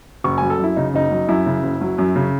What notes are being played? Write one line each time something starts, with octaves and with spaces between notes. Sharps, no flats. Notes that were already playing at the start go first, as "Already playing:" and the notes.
F#1 C#6
F#3 G#5
A4
F#2 E4
C#3 D#4
F#1 D#4
F#3
F#2 E4
C#3
F#1
F#3
F#2
C#3